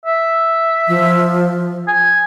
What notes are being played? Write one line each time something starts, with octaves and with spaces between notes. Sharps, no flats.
E5
F3
G#5